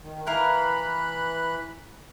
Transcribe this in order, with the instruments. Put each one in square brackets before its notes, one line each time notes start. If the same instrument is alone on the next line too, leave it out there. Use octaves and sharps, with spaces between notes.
[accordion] D#3
[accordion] E3 B5 F#6 [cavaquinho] E4 A#4 F5